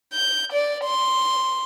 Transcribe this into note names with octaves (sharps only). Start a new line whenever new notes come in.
G6
D5
C6